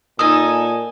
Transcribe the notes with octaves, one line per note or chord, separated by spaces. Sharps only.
A#2 D#4 A4 G#5 D#6